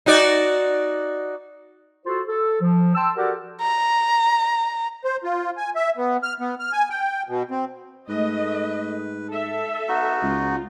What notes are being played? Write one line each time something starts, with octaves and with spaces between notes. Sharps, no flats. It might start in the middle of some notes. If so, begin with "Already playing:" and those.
D#4 F#4 D5
F4 F#4 A4 C5
A4
F3
G5 A5 C6 E6
F#4 G4 A4 A#4 D5 F#5
A#5
C5
F4
G#5
E5
B3
F6
B3
F6
G#5
G5
B2
C4
G#2 A3 B4 D#5
A4 E5
B3 D#4 F#4
C#2 F4